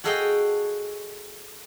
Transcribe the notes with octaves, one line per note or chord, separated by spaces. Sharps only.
F#4 G#4 A4 D#5 F5 G5